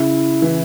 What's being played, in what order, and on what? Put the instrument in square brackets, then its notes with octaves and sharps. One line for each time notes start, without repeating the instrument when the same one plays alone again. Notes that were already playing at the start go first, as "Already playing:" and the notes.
Already playing: [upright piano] C#3 [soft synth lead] E4
[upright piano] E3